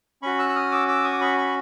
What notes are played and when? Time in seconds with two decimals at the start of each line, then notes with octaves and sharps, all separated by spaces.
0.22 C#4 F#4 B5 C#6
0.39 E6 F#6
0.49 E6
0.56 D#6 F6
0.72 D6 E6
0.88 D6 E6
1.04 C#6 D#6
1.12 D6
1.21 B5 C#6
1.38 B5 C#6